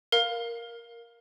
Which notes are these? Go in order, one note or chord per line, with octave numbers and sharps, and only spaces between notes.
A#4 F5